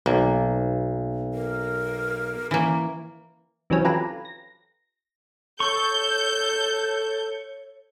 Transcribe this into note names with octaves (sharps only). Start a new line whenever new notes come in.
B1 A#3
A#4
E3 A#3 C#4
C3 E3 F#3 C4 C#4
F4 G4 A4 B4 G#5 A#5
A#6
A4 C#5 C#6 G6